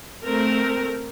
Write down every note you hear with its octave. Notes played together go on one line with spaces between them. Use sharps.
A3 C4 A#4